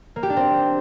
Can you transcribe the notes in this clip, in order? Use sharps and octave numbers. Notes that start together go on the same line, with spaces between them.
A#3
G4
D4
C4